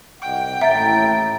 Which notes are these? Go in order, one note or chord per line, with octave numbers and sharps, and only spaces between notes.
C2 D#5 F#5 G5
A1 D#2 A2 E5 A#5 A6